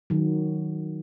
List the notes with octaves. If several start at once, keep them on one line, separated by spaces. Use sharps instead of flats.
D#3 F#3